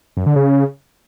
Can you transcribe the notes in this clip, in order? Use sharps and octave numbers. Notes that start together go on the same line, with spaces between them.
F#2
D3
C#3